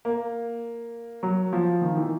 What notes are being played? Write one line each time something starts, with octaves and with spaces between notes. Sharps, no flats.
A#3
F#3
F3
D#3
E3